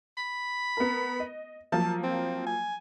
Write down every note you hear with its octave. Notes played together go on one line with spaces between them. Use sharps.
B5
B3 A#4
D#5
F3 F#3 A#3 A5
C4
G#5